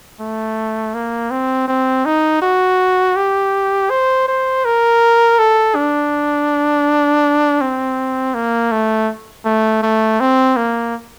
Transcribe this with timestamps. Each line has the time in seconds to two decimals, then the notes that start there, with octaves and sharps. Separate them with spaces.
0.20 A3
0.94 A#3
1.31 C4
1.68 C4
2.06 D#4
2.42 F#4
3.16 G4
3.90 C5
4.28 C5
4.65 A#4
5.39 A4
5.75 D4
7.61 C4
8.34 A#3
8.72 A3
9.45 A3
9.83 A3
10.20 C4
10.56 A#3